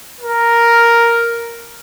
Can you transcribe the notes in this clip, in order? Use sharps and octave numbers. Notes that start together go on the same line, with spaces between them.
A#4